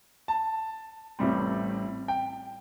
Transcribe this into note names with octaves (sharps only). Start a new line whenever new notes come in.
A5
A1 A2 G3 C4
G5